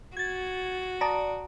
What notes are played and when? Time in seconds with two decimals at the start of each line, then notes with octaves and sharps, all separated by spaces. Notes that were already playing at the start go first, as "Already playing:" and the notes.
0.17 F#4 G#6 A6
1.01 D5 A5 A#5 D#6